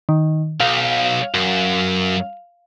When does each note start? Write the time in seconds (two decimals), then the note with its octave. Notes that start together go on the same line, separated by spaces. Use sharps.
0.09 D#3
0.60 B1 F5
1.34 F#2